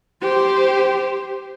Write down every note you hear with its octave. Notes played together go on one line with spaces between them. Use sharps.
G4 C5